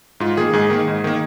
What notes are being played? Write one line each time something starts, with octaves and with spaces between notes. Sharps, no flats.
G#2 F4
D#3 A#3 G#4
G#2 G#4
D#3 A#3
G#2
D#3 A#3